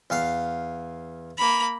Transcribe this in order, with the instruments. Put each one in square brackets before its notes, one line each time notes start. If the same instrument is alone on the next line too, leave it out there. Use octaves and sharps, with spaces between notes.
[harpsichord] E2 F5
[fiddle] A#3 B5